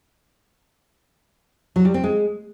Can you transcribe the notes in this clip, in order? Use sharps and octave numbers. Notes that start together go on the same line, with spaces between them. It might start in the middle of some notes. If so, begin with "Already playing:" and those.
F#3
G3
C4
G#3